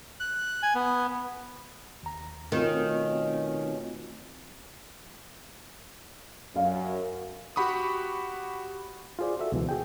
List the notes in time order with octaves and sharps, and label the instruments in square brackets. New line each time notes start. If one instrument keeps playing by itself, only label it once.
[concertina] F#6
G#5
B3
[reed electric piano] D#2 A#5
[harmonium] B2 C#4 [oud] D#3 [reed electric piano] A3 C4 F4
[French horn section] F#2 [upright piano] F5
[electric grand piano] F#4 G4 F#5 B5 C#6 D#6
[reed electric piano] F4 F#4 G#4 C5 D5
F#4 A4 E5
C#2 B2 E3
F#4 G#4 G5